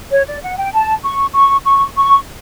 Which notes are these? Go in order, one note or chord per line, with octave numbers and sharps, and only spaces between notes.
C#5
D5
F#5
G5
A5
C#6
C#6
C#6
C#6